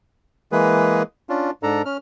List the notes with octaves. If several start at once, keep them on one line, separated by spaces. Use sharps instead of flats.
E3 G#3 A#3 G#4 B4
C#4 D4 F4
G#2 D4 A4 A#5
C#4 F6